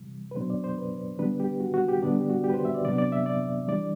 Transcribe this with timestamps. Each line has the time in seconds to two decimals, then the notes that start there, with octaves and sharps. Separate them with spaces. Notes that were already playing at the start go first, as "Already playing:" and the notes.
Already playing: C3 E3 G3
0.31 B4
0.36 B2 F#3 B3 D4 C5
0.50 D5
0.64 C5
0.78 B4
1.19 D3 G3 B3 D4 B4
1.40 G4
1.60 F#4
1.74 F#4
1.88 G4
2.02 D3 G3 B3 D4 D5
2.16 G4
2.29 F#4
2.44 G4
2.49 B4
2.54 C5
2.65 E5
2.74 D5
2.85 C3 F#3 B3 D4 D5
2.98 D5
3.12 E5
3.26 D5
3.68 E3 G3 D4 D5